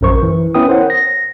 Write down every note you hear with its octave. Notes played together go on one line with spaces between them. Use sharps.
A#1 F#2 A#4 C5 C#6
E3
B3 C#4 E4 B4 G5 D#6
A#4 C5 C#5 F#5
A#6